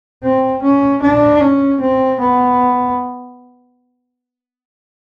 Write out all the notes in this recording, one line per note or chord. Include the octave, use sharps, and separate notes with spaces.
C4
C#4
D4
C#4
C4
B3